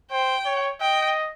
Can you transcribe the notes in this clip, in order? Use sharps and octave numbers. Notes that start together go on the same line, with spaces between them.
C5 G5
C#5
D#5 G5